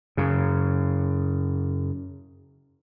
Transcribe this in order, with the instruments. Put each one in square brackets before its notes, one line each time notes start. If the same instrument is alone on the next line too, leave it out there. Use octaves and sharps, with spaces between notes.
[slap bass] F#2 C#3